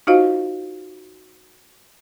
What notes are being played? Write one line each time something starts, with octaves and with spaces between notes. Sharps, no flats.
D#4 F4 F#4 C5 D#5 F5